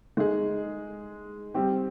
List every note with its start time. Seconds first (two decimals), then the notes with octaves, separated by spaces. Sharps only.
0.17 G#3 D#4 G#4
1.54 G3 C4 G4